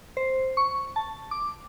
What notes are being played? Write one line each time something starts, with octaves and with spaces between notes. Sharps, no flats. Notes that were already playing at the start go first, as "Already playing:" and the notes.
C5
C#6
A5
D6